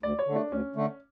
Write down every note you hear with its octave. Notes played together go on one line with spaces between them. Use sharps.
D2 D5
C#5
D3
A3 D4
D2 C#4
D3 A3